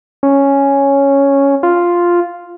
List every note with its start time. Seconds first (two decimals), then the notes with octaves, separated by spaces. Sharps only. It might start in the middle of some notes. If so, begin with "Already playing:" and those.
0.23 C#4
1.63 F4